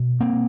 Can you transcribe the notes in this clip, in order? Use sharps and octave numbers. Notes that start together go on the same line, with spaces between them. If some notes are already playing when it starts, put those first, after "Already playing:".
Already playing: B2
A#3 C4